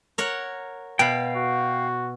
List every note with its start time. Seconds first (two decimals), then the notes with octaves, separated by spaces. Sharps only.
0.18 A#4 C#5 F#5
0.99 B2 F5 G5 B5
1.36 F#4